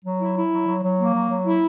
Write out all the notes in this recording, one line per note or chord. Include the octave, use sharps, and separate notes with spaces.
F#3
E4
E4
F#3
F#3
F#3
A#3
F#3
F#3
E4